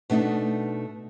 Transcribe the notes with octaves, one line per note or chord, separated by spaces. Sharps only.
B2 A3 D4 D#4